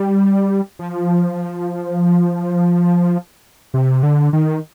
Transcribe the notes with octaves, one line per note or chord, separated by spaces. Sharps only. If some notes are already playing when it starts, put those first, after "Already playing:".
Already playing: G3
F3
C3
D3
D#3